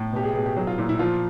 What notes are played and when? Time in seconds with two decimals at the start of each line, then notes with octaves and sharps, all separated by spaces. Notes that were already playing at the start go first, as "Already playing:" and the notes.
Already playing: A2
0.13 B2 G4
0.24 G#4
0.34 B2 G#4
0.46 G4
0.56 F#3 G#4
0.67 F4
0.78 A#2 E4
0.89 E4
0.99 F3 F4